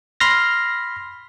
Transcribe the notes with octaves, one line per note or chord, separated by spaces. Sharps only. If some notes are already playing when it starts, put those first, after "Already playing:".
B5 C6 F6 A#6